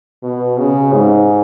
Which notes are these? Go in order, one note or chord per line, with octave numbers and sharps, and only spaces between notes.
B2
C#3
G#2